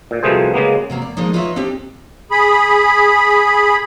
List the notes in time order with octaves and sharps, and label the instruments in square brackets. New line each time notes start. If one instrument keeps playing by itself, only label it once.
[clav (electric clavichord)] A#2
C2 B2 F3 A3 G#4 C5
C#3 G#3 A#3 B3
[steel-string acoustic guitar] C3 F#3 A#3 B3
D5
F3 G#3 A#3 D#4
D#4 F4 B4 C#5 D#5 E5
C4 D4 D#4 G4
[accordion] G#4 B5